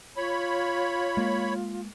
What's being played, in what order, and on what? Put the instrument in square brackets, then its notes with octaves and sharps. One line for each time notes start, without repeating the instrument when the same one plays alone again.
[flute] F4 [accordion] C#5 B5
[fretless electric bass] G#3 A#3